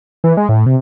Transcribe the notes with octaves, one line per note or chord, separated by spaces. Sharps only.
E3
G#3
A2
C3